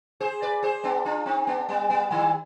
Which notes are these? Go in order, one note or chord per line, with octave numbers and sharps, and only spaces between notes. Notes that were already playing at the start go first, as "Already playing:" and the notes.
G#4 C5
B4 D5
G#4 C5
B3 D4
D4 F4
C4 D#4
B3 D4
G3 B3
G3 B3
D#3 G3